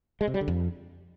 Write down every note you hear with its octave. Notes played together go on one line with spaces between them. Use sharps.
G#3
C3
G3
D3
F2